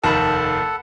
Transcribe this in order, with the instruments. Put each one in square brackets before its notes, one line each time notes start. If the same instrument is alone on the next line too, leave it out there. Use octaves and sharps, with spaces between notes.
[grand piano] F1 D#2 D#3 [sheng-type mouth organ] A4 F#5 [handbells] A5 B5